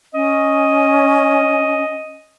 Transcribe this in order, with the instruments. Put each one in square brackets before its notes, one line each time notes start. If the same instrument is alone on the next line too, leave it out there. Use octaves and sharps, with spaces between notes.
[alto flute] C#4 [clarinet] D#5